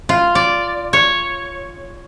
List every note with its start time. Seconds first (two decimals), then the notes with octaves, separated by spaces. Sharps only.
0.09 F4
0.35 D5
0.93 C#5